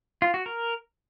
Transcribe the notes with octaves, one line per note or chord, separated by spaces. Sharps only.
F4
F#4
A#4